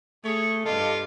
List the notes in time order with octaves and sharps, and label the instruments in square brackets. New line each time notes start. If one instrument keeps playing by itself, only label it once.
[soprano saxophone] A3 [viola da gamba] G#4 [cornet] C#5
[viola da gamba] G2 G4 [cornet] F4 [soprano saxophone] A4 [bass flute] D#5